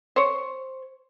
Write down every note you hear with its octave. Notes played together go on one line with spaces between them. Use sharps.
C5 C#5